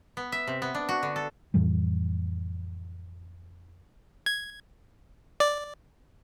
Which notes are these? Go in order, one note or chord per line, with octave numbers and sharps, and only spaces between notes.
B3
E5
C3
B3
D4
F#4
D3
A4
F2 A2 E3 G3
G#6
D5